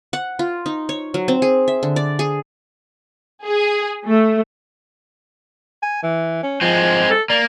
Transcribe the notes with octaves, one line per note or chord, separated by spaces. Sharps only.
F#5
F4
D#4
C#5
F#3
C4
G#4
E5
D3
D5
G#4
G#4
A3
G#5
E3
C#4
F3 G#3 C4
A4
A#3 D5